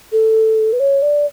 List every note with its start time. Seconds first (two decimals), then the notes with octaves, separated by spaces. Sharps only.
0.12 A4
0.73 B4
0.80 C#5
1.02 D5